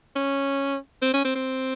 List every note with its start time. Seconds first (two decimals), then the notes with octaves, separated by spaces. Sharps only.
0.16 C#4
1.02 C4
1.14 C#4
1.25 C4
1.35 C4